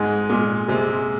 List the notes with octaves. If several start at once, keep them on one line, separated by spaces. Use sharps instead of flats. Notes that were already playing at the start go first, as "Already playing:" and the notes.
Already playing: G#2 G#3
A#2 G#3
C3 G#3